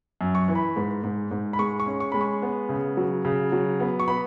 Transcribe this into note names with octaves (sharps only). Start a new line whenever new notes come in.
F#2
C#6
E3
B5
G#2
G#2
G#2
B5
G#3 C#6
C#6
C#4
C#6
G#3 B5
C#6
B3
C#3
F#3
C#3
F#3
B3
C#6
B3 B5